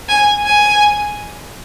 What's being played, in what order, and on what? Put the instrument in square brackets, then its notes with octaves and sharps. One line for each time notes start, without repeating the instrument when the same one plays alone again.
[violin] G#5
G#5